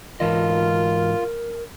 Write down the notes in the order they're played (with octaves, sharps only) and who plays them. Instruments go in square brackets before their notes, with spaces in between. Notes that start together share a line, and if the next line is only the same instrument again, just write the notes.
[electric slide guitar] G#2 E3 D#5 [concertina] F4 [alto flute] A#4